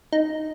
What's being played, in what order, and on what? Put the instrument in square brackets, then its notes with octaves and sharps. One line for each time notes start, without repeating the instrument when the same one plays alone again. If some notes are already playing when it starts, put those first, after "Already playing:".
[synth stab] D#4